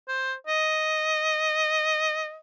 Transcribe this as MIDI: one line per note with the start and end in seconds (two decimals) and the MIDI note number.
0.08 0.34 72
0.47 2.38 75